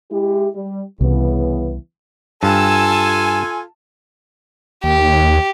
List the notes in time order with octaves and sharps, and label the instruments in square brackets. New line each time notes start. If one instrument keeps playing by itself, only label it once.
[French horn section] G#3 E4 G4
G3
[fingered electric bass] C2 [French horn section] C#3 E3 B3
[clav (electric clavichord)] G2 [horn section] F4 A4 G#5 [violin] A5 E6
[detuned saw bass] D#2 [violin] G4